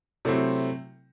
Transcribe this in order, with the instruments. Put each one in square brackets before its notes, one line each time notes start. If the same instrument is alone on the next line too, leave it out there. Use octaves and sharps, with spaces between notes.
[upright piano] C3 F#3 A3 C4 E4